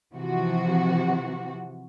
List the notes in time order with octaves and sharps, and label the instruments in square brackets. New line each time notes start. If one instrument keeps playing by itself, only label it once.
[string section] C3 E3 F3 F#4